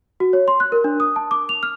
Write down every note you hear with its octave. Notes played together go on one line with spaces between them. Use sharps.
F#4
C#5
C6
F#6
A#4
D4
D#6
A5
D6
F7
F6